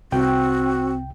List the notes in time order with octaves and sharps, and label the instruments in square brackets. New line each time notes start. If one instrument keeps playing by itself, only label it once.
[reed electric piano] C2 G5 [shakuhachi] C4 [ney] F#4